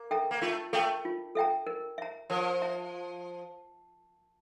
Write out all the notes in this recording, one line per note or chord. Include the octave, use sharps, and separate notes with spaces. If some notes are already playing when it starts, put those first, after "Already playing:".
Already playing: A#3
A4 E5 G5 A#5
A#3
A3 F4
A3 A4 E5 G5 A#5
F4
A4 E5 G5 A#5
A#4
E5 A#5
F3 A#4
E5 A#5